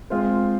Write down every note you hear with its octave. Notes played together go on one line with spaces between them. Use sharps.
G#3 C4 F4 C5